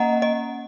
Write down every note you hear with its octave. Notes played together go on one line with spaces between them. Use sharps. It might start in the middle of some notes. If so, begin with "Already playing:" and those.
Already playing: A#3 C#4 D#5 F#5 A#5
D#5